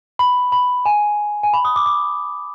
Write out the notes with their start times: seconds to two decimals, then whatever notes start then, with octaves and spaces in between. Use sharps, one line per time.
0.19 B5
0.52 B5
0.86 G#5
1.43 G#5
1.53 B5
1.65 D#6
1.76 D6
1.86 D6